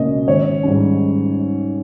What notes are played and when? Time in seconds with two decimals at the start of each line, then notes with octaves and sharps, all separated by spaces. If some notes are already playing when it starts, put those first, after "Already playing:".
Already playing: C#2 B2 A#3 C#4 D#5
0.27 G#1 C#5
0.63 G#2 G3 C#4